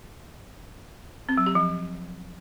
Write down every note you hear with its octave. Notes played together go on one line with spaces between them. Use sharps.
C4
F#3
G4
F3